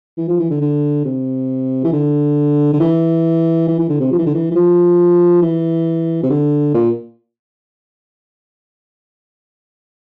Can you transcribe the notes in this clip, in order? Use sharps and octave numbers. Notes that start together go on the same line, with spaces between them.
E3
F3
E3
D3
D3
C3
E3
D3
D3
E3
E3
E3
D3
C3
F3
E3
D3
E3
E3
F3
E3
C3
D3
A#2